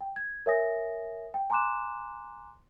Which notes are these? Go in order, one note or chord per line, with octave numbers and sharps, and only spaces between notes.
G5
G#6
A#4 C#5 E5 G#5 D#6 A#6
G5
G#5 A#5 C6 D6 F#6 E7